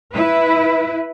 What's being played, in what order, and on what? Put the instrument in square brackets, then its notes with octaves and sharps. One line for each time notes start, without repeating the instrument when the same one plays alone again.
[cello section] E4 B4